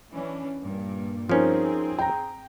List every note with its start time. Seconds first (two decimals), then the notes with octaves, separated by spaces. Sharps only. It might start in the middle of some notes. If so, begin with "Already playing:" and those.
0.10 E3 C#4 D4
0.60 G2 A#2 A#3
1.29 F3 C4 C#4 D#4 G#4 A#4 C5
1.99 G5 A#5